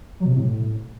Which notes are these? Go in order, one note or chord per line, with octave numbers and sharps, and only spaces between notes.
F#3
B2
C3
A2